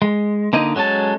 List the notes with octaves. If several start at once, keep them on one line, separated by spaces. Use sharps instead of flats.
G#3
D3 A#3 D#4 D#5
F#3 G#3 C#4 A4 A5